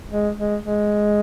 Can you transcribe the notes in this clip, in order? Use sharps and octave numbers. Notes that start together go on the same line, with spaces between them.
G#3
G#3
G#3